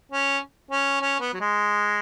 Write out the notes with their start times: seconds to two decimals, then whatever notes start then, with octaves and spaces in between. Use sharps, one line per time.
0.12 C#4
0.71 C#4
1.01 C#4
1.20 B3
1.33 F#3
1.40 G#3